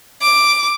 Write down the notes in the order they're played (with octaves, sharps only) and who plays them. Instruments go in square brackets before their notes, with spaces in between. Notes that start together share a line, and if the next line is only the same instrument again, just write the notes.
[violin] D6